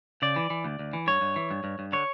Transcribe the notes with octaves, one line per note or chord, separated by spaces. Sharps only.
C#3 D5
E3
E3
D2
D2
E3
G2 C#5
G2
E3
G2
G2
G2
D3 C#5